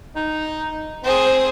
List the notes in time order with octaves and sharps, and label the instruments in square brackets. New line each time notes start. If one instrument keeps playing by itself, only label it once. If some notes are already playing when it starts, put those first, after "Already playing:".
[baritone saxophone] D#4
[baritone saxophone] C4 [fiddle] G#4 C5